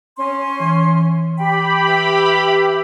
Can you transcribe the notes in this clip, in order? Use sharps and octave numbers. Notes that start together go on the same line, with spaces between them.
C#4 C6
E3 C#6
G4 G5 B5
B4 E5 G5